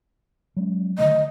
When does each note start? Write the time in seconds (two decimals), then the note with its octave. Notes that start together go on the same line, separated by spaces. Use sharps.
0.57 F#3 G#3 C#4
0.98 D3 D#3 A3 D#5